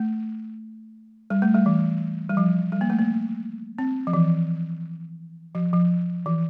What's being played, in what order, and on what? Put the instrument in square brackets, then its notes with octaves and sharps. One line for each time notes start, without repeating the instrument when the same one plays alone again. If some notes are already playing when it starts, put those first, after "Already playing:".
Already playing: [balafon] A3
G3
A3
G3
E3
G3
F3
G3
A#3
A3
A#3
C4
F3
E3
F3
F3
E3